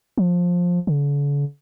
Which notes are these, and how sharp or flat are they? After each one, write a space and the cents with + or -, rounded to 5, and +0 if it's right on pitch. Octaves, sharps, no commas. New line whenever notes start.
F3 +15
D3 -45